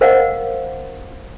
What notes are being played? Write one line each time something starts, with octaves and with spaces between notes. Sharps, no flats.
A#4 C5 D#5 F5 F#5